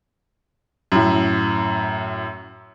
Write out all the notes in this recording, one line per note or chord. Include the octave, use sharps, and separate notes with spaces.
F#2 A2